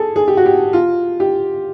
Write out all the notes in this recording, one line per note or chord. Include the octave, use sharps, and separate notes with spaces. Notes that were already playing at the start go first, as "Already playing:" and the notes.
Already playing: G#4 A4
G#4
G4
F#4
G4
F4
G4